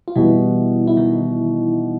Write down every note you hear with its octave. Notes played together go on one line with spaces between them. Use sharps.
F4
B2 E3 G3 B3 E4
E4
D#3 D#4